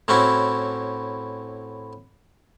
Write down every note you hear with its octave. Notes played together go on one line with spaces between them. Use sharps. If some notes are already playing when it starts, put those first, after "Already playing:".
A2 C4 C#4 E4 F#4